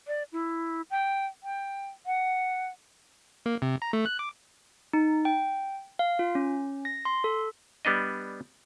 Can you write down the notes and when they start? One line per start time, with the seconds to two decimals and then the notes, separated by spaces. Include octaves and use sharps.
0.07 D5
0.32 E4
0.91 G5
1.43 G5
2.06 F#5
3.46 A#3
3.62 C3
3.82 A#5
3.93 A3
4.06 F#6
4.19 D6
4.93 D#4
5.25 G5
5.99 F5
6.19 F4
6.35 C#4
6.85 A#6
7.05 C6
7.24 A4
7.85 G3 B3 D4 D#5